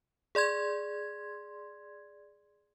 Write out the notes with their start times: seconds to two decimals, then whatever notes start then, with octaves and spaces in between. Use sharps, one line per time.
0.35 G#4 D5 C6 G#6